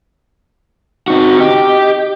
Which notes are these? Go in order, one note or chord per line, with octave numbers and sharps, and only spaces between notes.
C4 D#4 F#4
G4 D#5